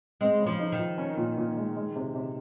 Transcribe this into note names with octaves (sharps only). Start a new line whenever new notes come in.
G#3 C4
C#3
F3
D#4
D#3
F3
C#4
A#2
A#2
G#3
G#3
C3
C3